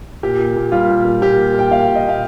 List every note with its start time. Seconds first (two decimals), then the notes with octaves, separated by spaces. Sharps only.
0.23 A#2 G4
0.39 A#2
0.56 A#2
0.72 G3 F4
0.89 A#2
1.05 A#2
1.21 A#2 G4
1.38 A#2
1.54 A#2 G5
1.71 A#3 F5
1.87 A#2
1.95 D#5
2.05 A#2 F5